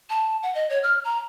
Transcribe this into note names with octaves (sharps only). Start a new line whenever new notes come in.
A5
F#5
D#5
C#5
F6
A#5